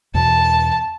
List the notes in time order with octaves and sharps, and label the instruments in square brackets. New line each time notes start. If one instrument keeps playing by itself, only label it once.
[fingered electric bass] E2 B2 E3 [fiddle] A5